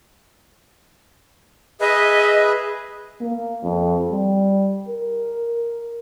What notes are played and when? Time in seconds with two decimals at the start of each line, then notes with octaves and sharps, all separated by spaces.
1.80 G#4 B4 D#5 E5
3.21 A#3
3.63 F2
4.11 G3
4.89 A#4